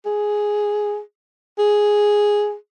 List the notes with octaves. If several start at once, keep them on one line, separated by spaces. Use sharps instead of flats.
G#4
G#4